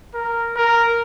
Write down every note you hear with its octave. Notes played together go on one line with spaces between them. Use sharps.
A#4
A#4